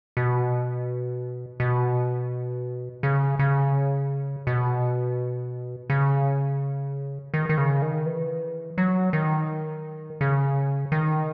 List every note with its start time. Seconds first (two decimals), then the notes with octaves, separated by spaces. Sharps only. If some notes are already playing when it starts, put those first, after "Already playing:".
0.17 B2
1.60 B2
3.03 C#3
3.39 C#3
4.47 B2
5.90 C#3
7.34 D#3
7.49 D#3
7.58 C#3
7.82 D#3
8.06 E3
8.78 F#3
9.13 D#3
10.21 C#3
10.92 D#3